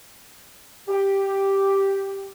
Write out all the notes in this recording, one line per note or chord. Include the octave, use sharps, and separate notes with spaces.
G4